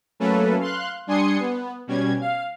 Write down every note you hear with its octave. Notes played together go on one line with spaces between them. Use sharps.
F#3 A3 A#3 C#4 A4 B4
F5 C6 F#6
G3 D4 G#5 C6 D#6 C#7
B3
B2 G3 C#4 G#6
F5